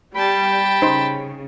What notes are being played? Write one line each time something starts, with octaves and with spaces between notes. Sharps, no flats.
G3 G5 A5 B5
C#3 D#4 C5